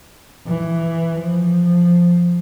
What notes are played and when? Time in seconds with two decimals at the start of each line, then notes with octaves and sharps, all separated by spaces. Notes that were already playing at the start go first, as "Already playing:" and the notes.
0.47 E3
1.21 F3